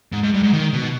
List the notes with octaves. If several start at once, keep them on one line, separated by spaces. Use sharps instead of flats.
G#2
G#2
G2
G#2
D#3
B2